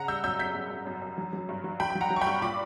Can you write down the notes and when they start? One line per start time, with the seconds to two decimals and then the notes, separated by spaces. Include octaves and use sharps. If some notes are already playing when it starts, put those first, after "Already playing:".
Already playing: C#3 F#5 A#5
0.08 G3 E6 G6
0.24 F#2 E6 G6
0.39 F#2 G6 B6
0.55 F#2
0.70 F#2
0.87 F#2
1.02 F#2
1.18 F#3
1.33 F#3
1.49 G2
1.64 F#3
1.80 F#3 G5 B5
1.90 F#3 B5
2.01 F#5 A#5
2.10 F#3
2.16 C#6
2.21 G5 B5
2.27 G2
2.42 A#2 B5 D6